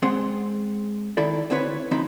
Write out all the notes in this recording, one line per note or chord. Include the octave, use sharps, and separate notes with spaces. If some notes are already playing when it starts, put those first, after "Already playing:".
G#3 C4 G#4 F#5 C6
D#3 E4 A4 D5
D2 C4 E4 B4 C#5 B5
D2 F3 C4 D#4 B5